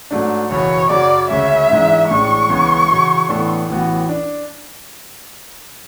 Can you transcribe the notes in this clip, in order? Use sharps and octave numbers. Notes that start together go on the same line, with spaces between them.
G#2 F#3 A3 D4
F#1 E2 B2 C#5
F#2 C#3 F#3 C#4 F#4 D5
D2 C#3 G#3 C#4 E5
G#2 E3 G#3 D4
A1 A2 G#3 D4 C#6
C#2 C#3 E3 G#3 B3
E2 C#3 F#3
A2 E3 B3 D4 A4
A1 A2 E3 B3 F#4
D4